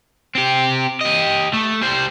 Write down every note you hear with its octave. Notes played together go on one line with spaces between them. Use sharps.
C4 G4
G4 D#5
A3
G3 C5